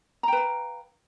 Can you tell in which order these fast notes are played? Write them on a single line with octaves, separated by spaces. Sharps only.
A#5 G5 B4 F5